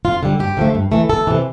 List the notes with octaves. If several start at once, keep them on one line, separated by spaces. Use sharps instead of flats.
F2 F4
D3 G3
G2 G4
D3 F3 A3
G2
E3 A3
E2 A4
C3 E3